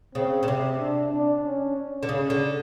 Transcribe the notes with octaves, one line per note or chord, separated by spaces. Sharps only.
C#3 C4
C#3
C3 C4
D4
D4
C#4
C#4
D3
C#3 C#4
D3